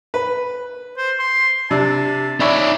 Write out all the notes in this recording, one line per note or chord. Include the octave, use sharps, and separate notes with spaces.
B4
C5
C6
C3 D4 A5
D#4 C#5 D5 E5 B5